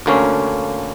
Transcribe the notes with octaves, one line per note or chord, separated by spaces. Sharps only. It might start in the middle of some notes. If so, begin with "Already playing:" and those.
D2 D3 A#3 C#4